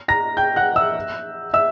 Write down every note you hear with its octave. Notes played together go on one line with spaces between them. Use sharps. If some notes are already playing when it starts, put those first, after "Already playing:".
A#5 A#6
G5 G6
F#5 F#6
E5 E6
E5 E6